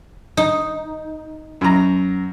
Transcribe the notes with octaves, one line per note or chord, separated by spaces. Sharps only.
D#4
F#2 A#5